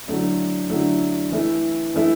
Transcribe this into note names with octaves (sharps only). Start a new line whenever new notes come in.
D3 F#3 A3 E4
D3 F#3 A3 E4
E3 A3 E4
E3 A3 E4